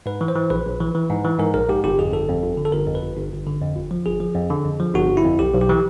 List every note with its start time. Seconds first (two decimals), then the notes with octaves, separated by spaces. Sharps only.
0.06 G#2 B4
0.21 E3
0.28 C5
0.36 E3
0.50 A#1 B4
0.66 A#1
0.80 E3
0.95 E3
1.10 G#2
1.25 E3
1.39 G#2 A#4
1.54 A#1 A#4
1.69 G#2 G4
1.84 G1 G4
1.99 F2 G#4
2.13 G1 A4
2.28 F2
2.43 G1
2.57 D3
2.65 A4
2.72 G1 A#4
2.87 F2
2.95 B4
3.02 G1
3.17 G1
3.32 G1
3.47 D3
3.62 F2
3.76 G1
3.91 F3
4.06 G1 G#4
4.20 F3
4.35 F2
4.50 D3
4.65 F2
4.80 F3
4.95 G1 F#4
5.09 G1
5.17 E4
5.24 F2
5.39 B1 G4
5.54 B1
5.62 G4
5.69 E3